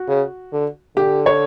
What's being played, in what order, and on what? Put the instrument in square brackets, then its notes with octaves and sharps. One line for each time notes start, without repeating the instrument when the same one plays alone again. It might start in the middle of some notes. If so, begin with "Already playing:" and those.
Already playing: [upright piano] F#4
[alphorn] C#3
D3
[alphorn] D3 [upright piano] G4
[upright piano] C#5